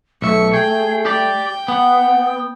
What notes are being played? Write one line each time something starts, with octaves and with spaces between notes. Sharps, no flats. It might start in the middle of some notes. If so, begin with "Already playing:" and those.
B1 A3 E5 C#6
G#4 G5
G4 D5 G5
B3 F#5